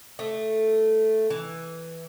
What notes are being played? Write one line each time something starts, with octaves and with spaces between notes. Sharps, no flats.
A3
E3